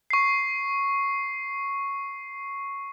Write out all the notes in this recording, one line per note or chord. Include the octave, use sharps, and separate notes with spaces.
C#6 C7